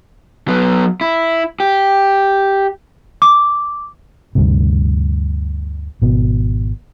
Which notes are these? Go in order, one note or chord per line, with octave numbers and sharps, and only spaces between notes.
F#3 B3
E4
G4
D6
D2 G2 C3
G#1 B2